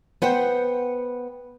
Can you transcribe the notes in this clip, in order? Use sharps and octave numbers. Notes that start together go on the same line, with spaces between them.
B3 C5 F#5 G5